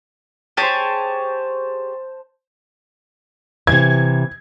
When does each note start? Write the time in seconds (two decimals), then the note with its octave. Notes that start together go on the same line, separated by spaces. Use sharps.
0.57 G4 G#4 C5 C#5 A5
3.67 C3 E3 G#6